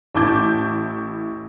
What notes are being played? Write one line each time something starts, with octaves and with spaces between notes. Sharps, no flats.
A1 A2 E4 A5 D6 G6